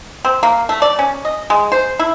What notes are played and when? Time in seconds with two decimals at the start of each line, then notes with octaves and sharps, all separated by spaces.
0.25 C4
0.43 A#3
0.69 A3
0.82 D5
0.99 C#4
1.25 D#5
1.50 G#3
1.72 C5
1.99 E4